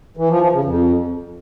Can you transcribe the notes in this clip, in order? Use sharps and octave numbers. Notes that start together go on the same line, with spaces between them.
E3
F3
F3
C#3
F2